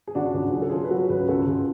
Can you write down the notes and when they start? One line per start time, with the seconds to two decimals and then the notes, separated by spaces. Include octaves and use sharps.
0.07 G#4
0.15 C#3 D4 F#4
0.34 C#2
0.52 F#3 G#4
0.62 A4
0.70 C#3 F4 G#4
0.84 B4
0.90 F#3 F#4 A4
1.09 C#2 G#4 B4
1.28 C#2 F#4 A4
1.47 C#2 F4 G#4